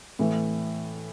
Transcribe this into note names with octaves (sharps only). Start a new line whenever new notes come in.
A2 E3